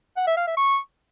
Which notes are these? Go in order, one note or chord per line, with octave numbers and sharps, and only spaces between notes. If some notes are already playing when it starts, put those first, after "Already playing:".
F#5
E5
F5
E5
C#6